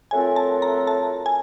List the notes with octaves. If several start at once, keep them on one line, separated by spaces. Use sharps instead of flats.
F#3 A3 C4 F4 A#4 G#5
A5
A#5
A5
G#5